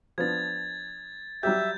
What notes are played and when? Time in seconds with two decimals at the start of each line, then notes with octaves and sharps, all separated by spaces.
0.18 F3 B3 D4 G#6 A6
1.43 F#3 G3 G4 E5 G6